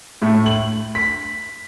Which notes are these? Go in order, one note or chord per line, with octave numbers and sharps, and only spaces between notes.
A2 A3
F#7
B6